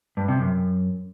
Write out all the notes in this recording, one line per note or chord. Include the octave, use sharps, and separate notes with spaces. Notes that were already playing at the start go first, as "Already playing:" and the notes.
G2
C3
F#2